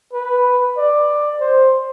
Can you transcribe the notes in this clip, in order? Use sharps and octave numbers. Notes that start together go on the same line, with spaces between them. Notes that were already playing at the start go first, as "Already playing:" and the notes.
B4
D5
C5